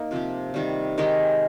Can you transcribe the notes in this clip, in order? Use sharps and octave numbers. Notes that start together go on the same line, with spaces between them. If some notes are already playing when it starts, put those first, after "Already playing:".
Already playing: A#3 D#4
C3 F3 C4 G4
C3 D#3 G3
D#3 G#3 D#4 G4